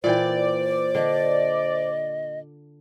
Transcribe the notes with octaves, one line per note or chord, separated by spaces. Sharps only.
A#2 E3 C5 D5 G5
D3 D#5